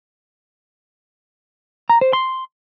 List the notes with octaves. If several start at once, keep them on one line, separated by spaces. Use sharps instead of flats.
A#5
C5
C6